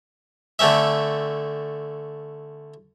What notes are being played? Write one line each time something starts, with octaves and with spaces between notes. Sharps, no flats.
D3 A3 C4 C#4 E5